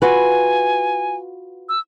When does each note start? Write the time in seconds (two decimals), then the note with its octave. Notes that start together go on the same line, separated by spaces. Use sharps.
0.02 F4 F#4 B4 G#5
1.69 E6